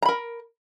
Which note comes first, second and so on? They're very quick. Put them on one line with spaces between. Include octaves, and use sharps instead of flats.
A#5 B5 A#4